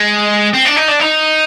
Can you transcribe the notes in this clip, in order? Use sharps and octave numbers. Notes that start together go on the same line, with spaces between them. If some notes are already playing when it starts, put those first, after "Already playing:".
Already playing: G#3
C4
D4
D#4
D4
D#4